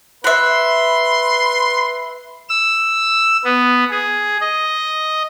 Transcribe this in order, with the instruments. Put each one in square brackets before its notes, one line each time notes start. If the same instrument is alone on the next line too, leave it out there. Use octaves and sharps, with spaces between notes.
[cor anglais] B4 [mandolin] E5 F#5 [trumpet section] C6
[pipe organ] E6
B3
G#4
D#5